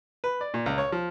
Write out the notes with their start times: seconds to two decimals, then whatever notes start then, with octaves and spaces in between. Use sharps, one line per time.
0.24 B4
0.41 D5
0.54 A#2
0.66 C#2
0.78 C#5
0.92 F3